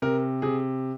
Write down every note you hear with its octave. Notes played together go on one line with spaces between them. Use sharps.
C3 A#4
C3 G#4